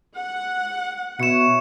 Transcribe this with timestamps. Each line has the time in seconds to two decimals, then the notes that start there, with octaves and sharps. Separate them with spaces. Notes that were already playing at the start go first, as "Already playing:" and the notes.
0.16 F#5
1.19 B2 E4 F#4 C#5 C#7 E7